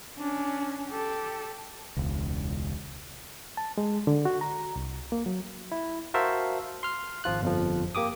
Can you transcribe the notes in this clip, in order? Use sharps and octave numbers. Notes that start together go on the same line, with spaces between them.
C#4 D4
G4 A4
E1 C#2
A5
G#3
D3
F#4
A#5
C2
A#3
F#3
E4
F#4 A#4 C5 E5 F5 A5
C6 F6
G#1 F3 F4 F#6
G1 F2 F3
A#3 G4 D6 D#6